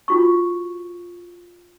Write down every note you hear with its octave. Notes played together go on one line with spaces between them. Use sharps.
F4 F#4 C#6